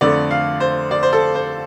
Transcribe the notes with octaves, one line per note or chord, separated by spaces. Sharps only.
F2 D3 A3 D5
F5
C5
D5
C5
A4
C5